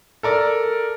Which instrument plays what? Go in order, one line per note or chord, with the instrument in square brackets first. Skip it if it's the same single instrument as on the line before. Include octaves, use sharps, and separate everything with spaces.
[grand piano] A4 A#4 D5